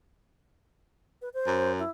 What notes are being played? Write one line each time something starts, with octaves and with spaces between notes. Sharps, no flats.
B4
C5
F#2
E4